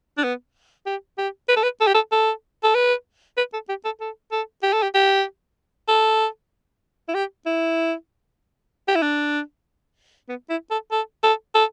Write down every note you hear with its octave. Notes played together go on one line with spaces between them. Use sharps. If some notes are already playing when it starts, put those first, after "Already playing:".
D4
B3
G4
G4
B4
A4
B4
A4
G4
A4
A4
A4
B4
B4
A4
G4
A4
A4
A4
G4
A4
G4
G4
A4
E4
G4
E4
G4
E4
D4
B3
E4
A4
A4
A4
A4